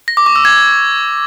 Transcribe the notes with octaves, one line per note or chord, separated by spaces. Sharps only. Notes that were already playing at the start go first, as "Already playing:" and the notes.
A#6
D6
C#6
E6
G#6